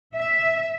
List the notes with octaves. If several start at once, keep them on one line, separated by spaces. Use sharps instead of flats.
E5